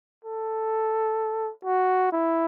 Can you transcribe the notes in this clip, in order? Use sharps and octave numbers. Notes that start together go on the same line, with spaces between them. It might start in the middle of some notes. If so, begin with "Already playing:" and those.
A4
F#4
E4